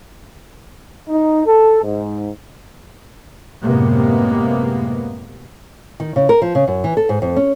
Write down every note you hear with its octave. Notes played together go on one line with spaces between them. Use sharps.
D#4
A4
G#2
F#2 A2 C3 G#3 A#3 B3
D#3
C#3
A#4
F3
C#3
F#2
E3
A4
G#2
F2
C#4